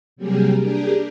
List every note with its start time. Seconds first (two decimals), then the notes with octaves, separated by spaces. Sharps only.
0.16 C3 F#3 G3 A#3 G4 G#4
0.60 D4 G4 G#4 A#4